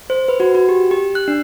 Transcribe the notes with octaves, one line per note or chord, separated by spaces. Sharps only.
C5
B4
F#4
F#4
G4
G4
F#6
D4